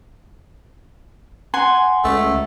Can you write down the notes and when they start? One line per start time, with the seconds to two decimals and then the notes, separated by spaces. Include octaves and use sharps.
1.54 F#5 G#5 C6
2.04 C#2 A3